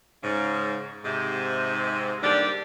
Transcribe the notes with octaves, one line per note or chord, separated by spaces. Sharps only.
G#2 C#3
G#2 C3
D#2 G3 D4 G4 D5